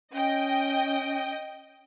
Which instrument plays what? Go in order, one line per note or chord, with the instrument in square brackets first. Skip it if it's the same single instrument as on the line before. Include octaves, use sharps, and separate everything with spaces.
[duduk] C#4 [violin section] D#5 G5